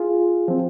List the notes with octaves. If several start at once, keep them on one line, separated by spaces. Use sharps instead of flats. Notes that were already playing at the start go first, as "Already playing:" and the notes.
Already playing: F4 G#4
F3 C4